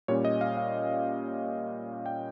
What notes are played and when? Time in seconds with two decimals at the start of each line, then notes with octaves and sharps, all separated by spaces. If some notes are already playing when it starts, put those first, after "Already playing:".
0.08 A#2 G3 C#4 C#5
0.25 D#5
0.41 F5
0.57 F5
2.06 G5